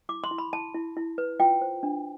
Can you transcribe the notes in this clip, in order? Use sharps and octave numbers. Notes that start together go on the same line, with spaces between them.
E4 D6
C6
E4
B5
E4 A5
E4
E4
B4
F4 G5
C5
D4